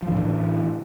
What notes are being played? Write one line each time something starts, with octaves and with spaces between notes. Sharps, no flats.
A2 D3 E3 F3